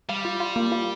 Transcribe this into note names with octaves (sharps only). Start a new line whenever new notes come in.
G3 F5
F4
F4
A#3
F4